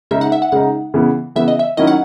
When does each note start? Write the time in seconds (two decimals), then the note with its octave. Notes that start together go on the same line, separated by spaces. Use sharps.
0.11 C#3 G#3 D#4 E5
0.21 F#5
0.32 E5
0.42 F#5
0.52 C#3 G#3 D#4 F#5
0.94 C#3 E3 B3
1.36 C#3 E3 B3 E5
1.48 D#5
1.59 E5
1.77 D#3 F#3 C#4 E4 D#5
1.87 F#5